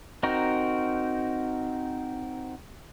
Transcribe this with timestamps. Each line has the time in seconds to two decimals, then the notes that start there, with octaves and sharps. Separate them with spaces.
0.23 C4 D#4 F#4 A#4